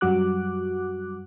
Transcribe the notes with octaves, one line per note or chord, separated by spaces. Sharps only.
F#2 F#3 G3 F#4 D6 F#6